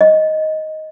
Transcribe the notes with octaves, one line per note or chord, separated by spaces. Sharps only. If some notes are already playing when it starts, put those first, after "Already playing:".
D#5